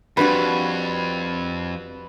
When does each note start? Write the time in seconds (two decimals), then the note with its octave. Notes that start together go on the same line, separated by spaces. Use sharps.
0.17 F2 G3 D4 F#4 B4